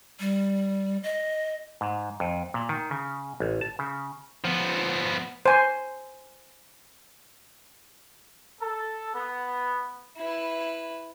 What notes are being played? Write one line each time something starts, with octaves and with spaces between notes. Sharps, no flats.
G3
D#5
G#2
F2
A#2
D#3
C#3
A1
A5
C#3
F3 B3
C5 G#5
A4
B3
E4 B4